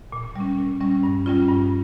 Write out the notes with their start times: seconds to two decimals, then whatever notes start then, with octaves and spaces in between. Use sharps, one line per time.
0.12 A#2
0.36 G3 C#4
0.58 A#2
0.80 G3 C#4
1.03 G2
1.26 G3 C#4 F4
1.49 G2